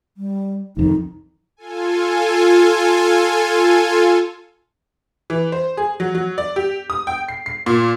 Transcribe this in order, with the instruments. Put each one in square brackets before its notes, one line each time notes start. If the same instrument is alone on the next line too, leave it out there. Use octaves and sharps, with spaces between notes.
[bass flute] G3
[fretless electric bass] C2 F2 D#3 [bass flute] D#4
[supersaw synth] F4 A4 G#5
[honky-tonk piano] E3
C5
G#4
F#3
F#3
D5
G4
D#6
G5
C7
C7
A#2